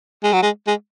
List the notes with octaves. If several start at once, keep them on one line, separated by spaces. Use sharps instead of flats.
G#3
F#3
G#3
G#3